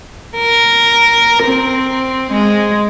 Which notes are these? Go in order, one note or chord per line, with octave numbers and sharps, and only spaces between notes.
A#4
C4
G#3